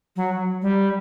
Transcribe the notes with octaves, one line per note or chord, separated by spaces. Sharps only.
F#3
G3